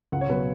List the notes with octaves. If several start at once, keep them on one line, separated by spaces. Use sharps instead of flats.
C#2 F#5
C#5
B2 F#3 B4